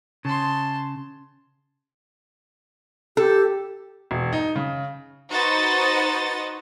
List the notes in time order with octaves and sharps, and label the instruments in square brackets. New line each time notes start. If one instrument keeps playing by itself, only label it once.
[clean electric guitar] C#3 [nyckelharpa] A5 C6
[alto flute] G4 [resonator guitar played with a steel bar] A4
[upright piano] E1
D#4
C#3
[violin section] D#4 F#4 B4 C5 D#5 A6